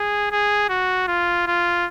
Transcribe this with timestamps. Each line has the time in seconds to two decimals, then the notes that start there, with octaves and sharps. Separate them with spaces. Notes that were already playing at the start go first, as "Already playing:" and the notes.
Already playing: G#4
0.31 G#4
0.70 F#4
1.08 F4
1.47 F4